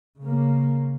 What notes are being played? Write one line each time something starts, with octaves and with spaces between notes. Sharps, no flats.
C#3 A#3